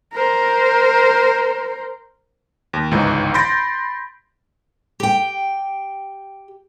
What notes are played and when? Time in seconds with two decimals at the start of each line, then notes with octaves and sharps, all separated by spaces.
0.13 A#4 C5
2.73 D#2
2.91 G1 C#2 G#2 E3 D#4
3.34 B5 C6 G6 A6 A#6 D7
5.00 G4 G5